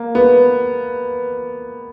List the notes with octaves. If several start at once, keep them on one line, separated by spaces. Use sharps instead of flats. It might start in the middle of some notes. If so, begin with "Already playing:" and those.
Already playing: A#3
B3